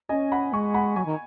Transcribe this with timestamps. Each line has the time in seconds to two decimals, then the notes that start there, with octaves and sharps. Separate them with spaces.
0.09 C#4 D#5 G#5
0.32 F#5 B5
0.52 G#3 G#5 C#6
0.74 F#5 B5
0.96 F#3 G#5 C#6
1.05 D#3